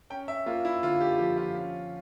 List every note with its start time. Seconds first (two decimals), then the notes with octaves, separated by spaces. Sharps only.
0.10 C#4 G5
0.28 E5
0.46 A#3 F4
0.65 E4
0.83 D3 F4
1.01 G4
1.18 F3 G4
1.37 F4
1.54 C#4